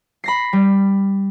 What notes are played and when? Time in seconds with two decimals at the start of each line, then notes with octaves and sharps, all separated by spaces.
0.24 B5 A#6 C7
0.53 G3